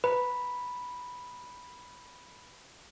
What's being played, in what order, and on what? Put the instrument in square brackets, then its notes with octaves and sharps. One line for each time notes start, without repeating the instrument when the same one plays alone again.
[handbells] B4 [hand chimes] A#5 B5